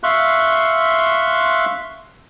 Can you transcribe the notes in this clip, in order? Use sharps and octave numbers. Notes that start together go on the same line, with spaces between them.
E5 F5 C6 C#6 F#6